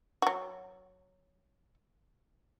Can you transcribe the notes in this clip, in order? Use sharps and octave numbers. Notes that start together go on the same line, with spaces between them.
F#3 F#4